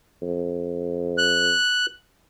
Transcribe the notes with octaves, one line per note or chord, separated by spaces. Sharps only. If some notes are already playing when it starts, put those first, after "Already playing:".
F2
F#6